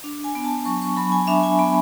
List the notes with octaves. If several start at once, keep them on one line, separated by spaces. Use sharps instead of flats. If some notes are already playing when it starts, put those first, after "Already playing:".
D4
G#5
B3
A5
F#3 C#6
C#6
F#3 B5
G#5
D4 E5
G#5
B3 B5